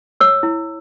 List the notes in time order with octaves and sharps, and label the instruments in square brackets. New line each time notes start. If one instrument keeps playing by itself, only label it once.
[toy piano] C#5 E6
E4